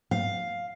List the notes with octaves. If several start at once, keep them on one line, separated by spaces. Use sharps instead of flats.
F5